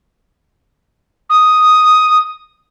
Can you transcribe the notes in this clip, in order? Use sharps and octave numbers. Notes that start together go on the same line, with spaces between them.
D#6